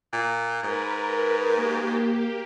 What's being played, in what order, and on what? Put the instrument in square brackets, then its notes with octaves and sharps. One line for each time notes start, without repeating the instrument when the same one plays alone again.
[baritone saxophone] A#2
[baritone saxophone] G#2 [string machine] A#4 B4
[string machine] A#3 G4